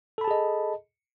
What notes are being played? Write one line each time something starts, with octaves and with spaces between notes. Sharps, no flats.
G#4 A4 D#5 A5 B5